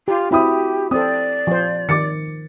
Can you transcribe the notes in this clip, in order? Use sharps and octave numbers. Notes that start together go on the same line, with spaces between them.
F4 G4
C4 E4 F#4 G4 B5 D#6
C4 A4 D5 D#6
F3 C5
D#3 D6 A6 C#7